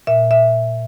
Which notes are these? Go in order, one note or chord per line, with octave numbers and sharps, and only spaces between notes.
A#2 E5
E5